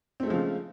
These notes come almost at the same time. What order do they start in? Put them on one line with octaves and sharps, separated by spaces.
C4 A3 G#3 F3 C#3